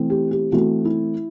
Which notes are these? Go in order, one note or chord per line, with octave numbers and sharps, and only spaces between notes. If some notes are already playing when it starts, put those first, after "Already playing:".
Already playing: E3 A3 C4
G4
G4
E3 A3 C4 F#4
E4